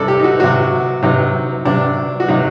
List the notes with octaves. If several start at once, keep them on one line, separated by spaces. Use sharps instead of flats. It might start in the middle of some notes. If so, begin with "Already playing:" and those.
Already playing: C3 G3 A4 D5
G4
D#4
F#4
C3 F#3 F#4
C3 F#3 D#4
C3 F#3 D4
F#4
C3 F#3 D#4